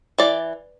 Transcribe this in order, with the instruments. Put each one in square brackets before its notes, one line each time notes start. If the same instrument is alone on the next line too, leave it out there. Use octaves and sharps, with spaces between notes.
[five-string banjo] E3 D5